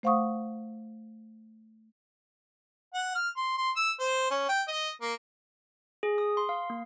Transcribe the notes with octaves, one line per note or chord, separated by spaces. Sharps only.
A3 C5 F5 F#5 C#6 D#6
F#5
F6
C6
C6
E6
C5
C#4
G5
D#5
A#3
G#4
D#6
C6
F5
A#3